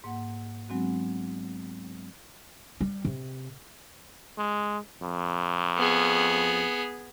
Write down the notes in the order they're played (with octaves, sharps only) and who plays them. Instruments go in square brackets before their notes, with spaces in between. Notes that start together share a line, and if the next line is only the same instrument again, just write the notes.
[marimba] G#2 A#3 F#5
F#3 G#3 B3 C4 D4 F#4
[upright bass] G3
C3
[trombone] G#3
F2
[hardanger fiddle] B3 G#4